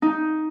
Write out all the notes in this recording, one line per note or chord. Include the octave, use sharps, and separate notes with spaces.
D#4